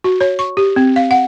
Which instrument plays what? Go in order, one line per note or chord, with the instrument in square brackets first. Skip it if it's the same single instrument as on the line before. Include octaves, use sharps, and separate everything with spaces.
[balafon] F#4
C#5
C#6
G4
C4
F5
F#5